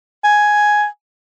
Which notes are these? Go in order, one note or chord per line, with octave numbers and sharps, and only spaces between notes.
G#5